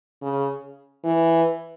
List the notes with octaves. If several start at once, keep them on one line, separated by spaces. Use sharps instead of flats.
C#3
E3